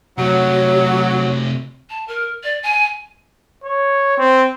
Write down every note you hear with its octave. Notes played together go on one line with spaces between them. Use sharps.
C3 F#3 A3 F#4
A5
A#4
D5
G#5
C#5
C4